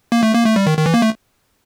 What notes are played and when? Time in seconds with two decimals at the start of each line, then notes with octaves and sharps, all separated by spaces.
0.12 A#3
0.23 A3
0.34 A#3
0.45 A3
0.56 G3
0.67 D#3
0.78 D#3
0.86 E3
0.94 A#3
1.02 A3